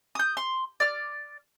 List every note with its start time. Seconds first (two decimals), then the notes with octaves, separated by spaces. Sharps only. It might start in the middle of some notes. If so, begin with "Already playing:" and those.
0.15 D#6 G6
0.37 C6
0.80 D5 F6